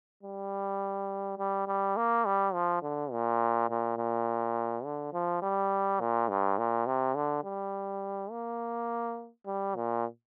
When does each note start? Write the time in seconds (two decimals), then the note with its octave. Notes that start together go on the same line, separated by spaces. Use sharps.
0.23 G3
1.38 G3
1.67 G3
1.97 A#3
2.26 G3
2.54 F3
2.82 D3
3.12 A#2
3.70 A#2
3.98 A#2
4.85 D3
5.13 F3
5.42 G3
6.00 A#2
6.29 G2
6.58 A#2
6.87 C3
7.15 D3
7.44 G3
8.31 A#3
9.47 G3
9.75 A#2